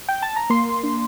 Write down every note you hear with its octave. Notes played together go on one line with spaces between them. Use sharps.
G5
A5
A#5
A#3 C6
A#3
D4